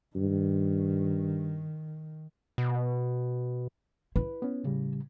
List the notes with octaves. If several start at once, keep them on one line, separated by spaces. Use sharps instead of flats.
G2 D#3
B2
E4 B4
B3 C#4
A2 C#3 G3